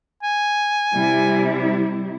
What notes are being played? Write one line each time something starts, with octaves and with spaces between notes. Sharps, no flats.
G#5
C3 G3 E4